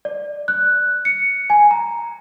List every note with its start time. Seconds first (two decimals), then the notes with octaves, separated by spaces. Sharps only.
0.05 D5
0.48 F#6
1.05 C#7
1.50 G#5
1.71 A#5